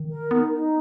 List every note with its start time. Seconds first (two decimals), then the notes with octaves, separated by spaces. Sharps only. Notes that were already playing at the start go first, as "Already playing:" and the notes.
Already playing: D#3
0.09 A#4
0.31 B3 D#4
0.53 D#4